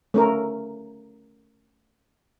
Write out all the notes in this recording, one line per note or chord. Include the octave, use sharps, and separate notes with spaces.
A3 C#4 A#4